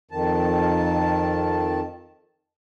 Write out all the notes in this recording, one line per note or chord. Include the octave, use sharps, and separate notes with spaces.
F2 D#3 A5